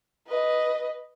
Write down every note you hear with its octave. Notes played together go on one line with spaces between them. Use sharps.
B4 D#5